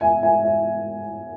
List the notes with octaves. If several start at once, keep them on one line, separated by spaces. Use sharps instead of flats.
E5 G#5
E5 G#5
E5